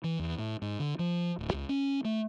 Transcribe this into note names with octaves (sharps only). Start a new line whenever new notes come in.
E3
E2
A2
G#2
D3
F3
D1
C#2
C#4
A3